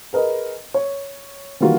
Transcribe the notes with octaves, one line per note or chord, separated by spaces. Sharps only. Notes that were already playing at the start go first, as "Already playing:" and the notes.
G#4 A#4 B4 D#5
C#5
D#3 E3 G3 A#3 F4 F#4